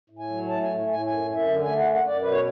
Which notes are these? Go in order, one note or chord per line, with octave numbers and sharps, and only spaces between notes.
A2
G#5
F#3
A3 A5
A2 G#5
A2 G#5
F#2 G#5
F#2
E5
D3
A3 G#5
F#5
F#2
F#5
F#2 D5
B2 B4
C#5